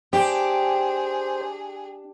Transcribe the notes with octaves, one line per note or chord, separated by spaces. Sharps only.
D4 G4 G#4 C5